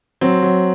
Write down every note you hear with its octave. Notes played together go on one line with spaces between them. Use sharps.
F#3 C4
F#3